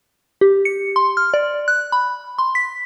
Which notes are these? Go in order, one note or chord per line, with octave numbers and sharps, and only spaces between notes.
G4
C#7
C6
F6
D5
F#6
B5
C6
B6